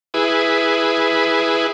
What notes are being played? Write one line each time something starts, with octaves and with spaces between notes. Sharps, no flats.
E4 G#4 B4